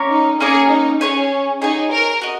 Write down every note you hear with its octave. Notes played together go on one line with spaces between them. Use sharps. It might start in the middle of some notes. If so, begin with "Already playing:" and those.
Already playing: A#3 C#4 A#4 C#5
D#4
A#3 C#4 G#4 A#4 C#5
D#4
C#4 G#4 C#5 G#5
D#4 G#4 C#5 G#5
A#4
F#4 D#5